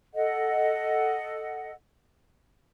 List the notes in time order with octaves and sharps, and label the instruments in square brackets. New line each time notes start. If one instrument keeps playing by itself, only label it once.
[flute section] A4 D#5 F#5